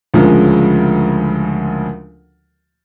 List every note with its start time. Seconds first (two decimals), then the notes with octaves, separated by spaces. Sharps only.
0.14 D2 C#3 F3 G#3 A#4